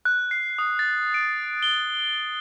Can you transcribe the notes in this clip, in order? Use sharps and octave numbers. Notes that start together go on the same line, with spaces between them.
F#6
C7
D#6
A6
D7
G7